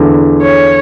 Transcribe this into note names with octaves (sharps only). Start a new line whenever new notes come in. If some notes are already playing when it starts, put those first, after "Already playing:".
Already playing: E2 D3 A3 E4
C#5